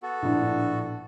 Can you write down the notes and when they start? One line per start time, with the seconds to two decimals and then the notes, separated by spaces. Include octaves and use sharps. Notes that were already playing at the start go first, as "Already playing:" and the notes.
0.03 B3 F#4 A4
0.22 A#1 A2 D4